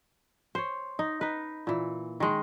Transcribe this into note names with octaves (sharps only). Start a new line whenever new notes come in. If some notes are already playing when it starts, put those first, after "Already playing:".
C5 C#5
D#4
D#4 B4
A#2 E3
D#3 G#3